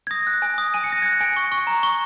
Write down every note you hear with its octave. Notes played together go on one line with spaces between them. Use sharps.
G#6
D#6 A#6
F#6
G#5
D#6
G#5 D#7
C#7
F#6 A#6
F#6 G#6 C#7
G#5
C#6
C#6
A#5
C#6